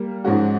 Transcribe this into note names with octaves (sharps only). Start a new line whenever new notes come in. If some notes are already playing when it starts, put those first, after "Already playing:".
Already playing: G3 A#3
G#2 F3 G#3 C#4 F#4